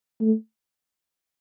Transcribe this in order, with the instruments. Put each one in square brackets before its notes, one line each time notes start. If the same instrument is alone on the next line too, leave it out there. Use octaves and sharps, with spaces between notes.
[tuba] A3